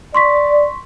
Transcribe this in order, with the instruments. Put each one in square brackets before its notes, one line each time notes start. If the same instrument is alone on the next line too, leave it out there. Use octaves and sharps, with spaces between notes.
[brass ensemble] D5 [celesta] C6 C#6 B6